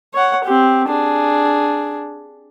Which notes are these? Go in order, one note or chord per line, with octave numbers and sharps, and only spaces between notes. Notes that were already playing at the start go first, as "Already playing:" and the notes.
C#5 F#5
C4 G4
D4 G#4